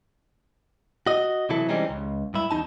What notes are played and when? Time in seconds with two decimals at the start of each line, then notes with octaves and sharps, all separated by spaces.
1.07 F#4 D#5
1.49 C3 E3 F#3 E4 A4
1.69 E3 G3 G#3 C4 C#4 D#4
1.89 C#2
2.34 G2 E4
2.51 E2 G#3 D#4 A5